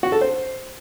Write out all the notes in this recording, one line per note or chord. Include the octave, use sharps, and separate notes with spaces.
F#4
A4
C5